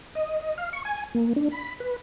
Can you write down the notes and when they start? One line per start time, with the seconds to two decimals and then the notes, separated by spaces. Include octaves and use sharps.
0.15 D#5
0.41 D#5
0.58 F5
0.73 C#6
0.85 G#5
1.15 A#3
1.36 D4
1.52 B5
1.80 B4